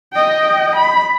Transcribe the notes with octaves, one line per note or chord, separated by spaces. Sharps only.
D#5 G5
B5